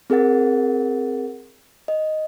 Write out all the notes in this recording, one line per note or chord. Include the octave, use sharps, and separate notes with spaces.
C4 G#4 A#4 F#5 A6
D#5